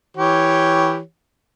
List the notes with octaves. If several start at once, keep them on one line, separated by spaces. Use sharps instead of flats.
E3 G4 C#5